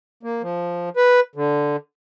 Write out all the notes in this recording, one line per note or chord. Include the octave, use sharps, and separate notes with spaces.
A#3
F3
B4
D3